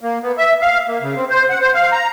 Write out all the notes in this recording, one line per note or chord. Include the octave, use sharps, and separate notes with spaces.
A#3
B3
E5
F5
A#3
C#3
C4
C5
F#5
C5
F5
A#5